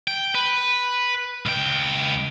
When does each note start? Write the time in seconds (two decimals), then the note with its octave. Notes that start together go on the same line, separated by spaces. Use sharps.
0.08 G5
0.35 B4
1.46 C#2 G5